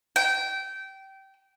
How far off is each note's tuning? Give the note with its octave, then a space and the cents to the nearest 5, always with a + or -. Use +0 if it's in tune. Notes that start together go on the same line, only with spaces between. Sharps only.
G5 -20